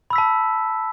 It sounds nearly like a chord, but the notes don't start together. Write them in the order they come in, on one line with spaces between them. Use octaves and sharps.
B5 E6 B6 A5